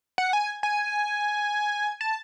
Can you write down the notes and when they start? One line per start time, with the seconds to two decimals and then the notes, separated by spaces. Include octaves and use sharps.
0.18 F#5
0.33 G#5
0.63 G#5
2.01 A5